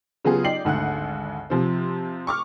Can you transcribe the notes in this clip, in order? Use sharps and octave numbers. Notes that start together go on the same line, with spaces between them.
C#3 F#3 B3 F4 G4 G#4
D#4 D5 G5 C7 F#7
G#1 D2 F#5 F#6
C3 F3 C4
C#6 D6 F6